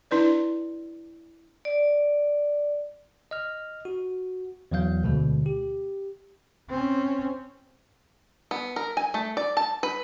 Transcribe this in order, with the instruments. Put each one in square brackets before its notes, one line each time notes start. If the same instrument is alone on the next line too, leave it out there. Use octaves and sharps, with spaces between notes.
[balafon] D4 E4 B4 D5
[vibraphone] D5
[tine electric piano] D#5 F6
F#4
E2 E3 F#3 F5 G6
D2 B2 D3 G#3
G4
[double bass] C4 C#4
[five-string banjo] B3
A#4
G#5
A3
D5
A5
B4